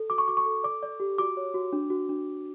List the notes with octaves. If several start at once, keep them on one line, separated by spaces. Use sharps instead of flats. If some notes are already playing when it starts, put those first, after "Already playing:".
Already playing: A4
F#4 D6
C#6
F#4 D6
C#6
A4
D5 D6
D5
G4
F#4 D6
C#5
F#4
D4
F#4
D4